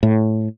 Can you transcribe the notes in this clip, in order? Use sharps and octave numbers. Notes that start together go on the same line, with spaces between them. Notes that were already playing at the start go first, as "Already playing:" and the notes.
A2